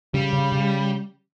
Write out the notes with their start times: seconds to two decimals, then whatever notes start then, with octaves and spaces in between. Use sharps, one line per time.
0.14 C#3 G3
0.33 C#3
0.52 C#3